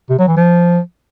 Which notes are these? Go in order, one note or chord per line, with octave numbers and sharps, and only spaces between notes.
C3
F#3
E3
F3